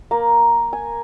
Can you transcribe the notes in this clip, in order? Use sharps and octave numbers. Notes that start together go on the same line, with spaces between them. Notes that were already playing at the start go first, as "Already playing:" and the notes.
A#3
G#5